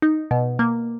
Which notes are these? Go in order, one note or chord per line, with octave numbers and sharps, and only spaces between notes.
D#4
B2
A#3